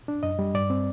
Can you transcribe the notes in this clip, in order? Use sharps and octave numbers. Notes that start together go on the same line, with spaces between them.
D4
F#2 D#5
G3
G2 D5
C4